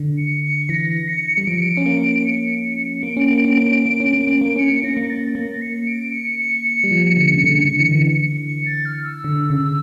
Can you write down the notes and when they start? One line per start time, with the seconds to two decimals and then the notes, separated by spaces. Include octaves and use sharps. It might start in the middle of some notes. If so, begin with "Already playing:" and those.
Already playing: D3
0.18 C#7
0.44 C#7
0.69 E3 A#6
1.08 C#7
1.37 G3
1.47 F3 D7
1.54 C#7
1.62 D7
1.77 C#4
1.86 A#3
2.25 C#7
3.02 A#3 D7
3.17 C#4
3.31 A#3
3.45 C#4
3.58 A#3
3.72 C#4
3.86 A#3
4.00 C#4
4.14 A#3
4.27 C#4
4.41 A#3
4.56 C#4 C#7
4.70 A#3
4.84 C#4 A#6
4.97 A#3
5.10 A6
5.35 A#3 A#6
5.62 C#7
5.87 D7
6.13 C#7
6.39 C#7
6.65 C#7
6.84 G3
6.91 F3
7.17 D3
7.34 C#3
7.43 D3
7.69 D3
7.80 E3
7.91 D3
8.46 C#7
8.66 A6
8.85 F6
9.04 E6
9.24 D3
9.50 C#3